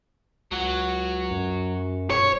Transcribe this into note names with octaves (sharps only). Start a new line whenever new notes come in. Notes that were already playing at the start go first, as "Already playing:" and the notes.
C#2 F#3 F#4
F#2
D#1 C#5